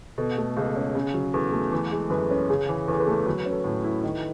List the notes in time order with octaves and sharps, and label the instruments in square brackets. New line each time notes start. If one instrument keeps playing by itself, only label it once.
[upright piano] B2 [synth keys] A4
[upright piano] A3
[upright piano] C#2 [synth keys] G#4
[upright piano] C#4
C#3
F#3
[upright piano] E2 [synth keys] A4
[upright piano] A3
E3
G#3
[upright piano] F#2 [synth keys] B4
[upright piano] C#4 [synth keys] B4
[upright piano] C#3 [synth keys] G#4
[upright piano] E3
[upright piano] E2 [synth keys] A4
[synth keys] B4
[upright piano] A3 [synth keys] A4
[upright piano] F#3 [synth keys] B4
[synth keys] B4
[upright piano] C#4
[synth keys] A4
[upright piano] A2
E4
D#3